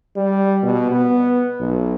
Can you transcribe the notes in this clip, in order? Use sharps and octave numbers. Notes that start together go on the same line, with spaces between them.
G3
B2
B3
B1